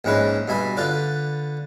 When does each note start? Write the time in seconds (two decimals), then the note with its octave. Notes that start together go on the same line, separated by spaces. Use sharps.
0.04 A#1 G#2 C#4 E4 B4
0.48 G2 B2 E5 G#5 B5
0.77 D3 F4 B4 D5